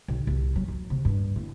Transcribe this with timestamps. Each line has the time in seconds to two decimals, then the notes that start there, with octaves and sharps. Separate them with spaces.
0.08 B1
0.27 C2
0.56 F#3
0.68 F#3
0.90 C3
1.05 G2
1.36 A2